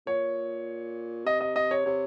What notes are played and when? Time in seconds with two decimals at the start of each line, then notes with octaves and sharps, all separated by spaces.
0.07 A#2 C#5
1.26 C3 D#5
1.41 D#5
1.56 D#5
1.71 C#5
1.86 C3 C#5